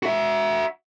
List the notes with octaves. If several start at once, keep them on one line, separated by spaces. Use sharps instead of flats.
F#4 E5